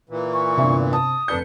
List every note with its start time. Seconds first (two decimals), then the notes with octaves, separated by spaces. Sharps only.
0.10 A#2 E3
0.33 C#6
0.58 G1 C3 D4 E5
0.93 A5 D#6
1.28 F1 D4 B4 G6 C#7